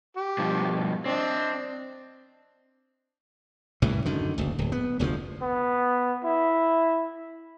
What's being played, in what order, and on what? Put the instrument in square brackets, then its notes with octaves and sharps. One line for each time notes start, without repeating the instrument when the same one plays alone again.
[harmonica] G4
[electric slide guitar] G2 B2 F3
[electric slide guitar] C4 [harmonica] D4 D#5
[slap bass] C2 A2 E3
F#2 D3 D#3
F#1 D2
D1
B3
F1 D2 C#3 F3
[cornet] B3
E4